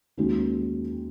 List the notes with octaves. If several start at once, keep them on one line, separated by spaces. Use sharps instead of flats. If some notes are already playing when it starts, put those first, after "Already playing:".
D#2 D#3 G#3 C#4 F#4